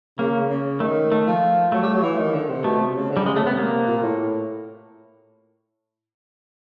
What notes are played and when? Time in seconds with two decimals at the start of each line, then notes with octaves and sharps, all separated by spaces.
0.18 C#3 A#3
0.50 C#3
0.80 D#3 A3
1.11 D#3 A3
1.26 F3
1.72 F#3 A3
1.83 G3
1.94 F#3
2.03 E3
2.18 D#3
2.34 D3
2.49 C3
2.64 B2 A3
2.79 C3
2.96 C#3
3.10 D3
3.17 G3
3.26 C#3 G#3
3.36 A3
3.41 C3
3.47 B3
3.57 A#3
3.87 A#2
4.03 A2